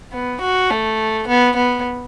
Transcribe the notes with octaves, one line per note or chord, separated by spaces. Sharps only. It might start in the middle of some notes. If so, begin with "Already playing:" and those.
B3
F#4
A3
B3
B3